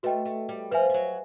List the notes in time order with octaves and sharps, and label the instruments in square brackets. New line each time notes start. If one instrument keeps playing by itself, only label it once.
[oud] A3 [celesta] F#4 B4 D#5 G5
[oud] A3
G3
[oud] F3 [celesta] B4 E5 G#5
[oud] F3
F#3